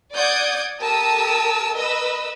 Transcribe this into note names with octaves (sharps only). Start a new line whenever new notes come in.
D5 F#5 D#6 G6 G#6
G4 A4 A#4 A5 D#6 E6
A#4 B4 D#5 E6